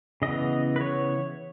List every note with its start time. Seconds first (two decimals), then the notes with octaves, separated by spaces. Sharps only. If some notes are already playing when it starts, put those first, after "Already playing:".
0.22 C#3 E3 B3 D#5
0.76 B4
0.81 C#5